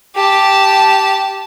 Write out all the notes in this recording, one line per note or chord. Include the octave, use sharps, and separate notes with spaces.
G4 A5